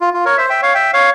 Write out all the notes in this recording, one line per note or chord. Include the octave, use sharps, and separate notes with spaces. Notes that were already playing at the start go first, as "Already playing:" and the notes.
F4
F4
A#4 C#5
C5 E5
E5 G5
C#5 F5
E5 G5
C#5 F5